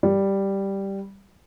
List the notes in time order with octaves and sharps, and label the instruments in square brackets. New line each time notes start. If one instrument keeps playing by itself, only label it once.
[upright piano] G3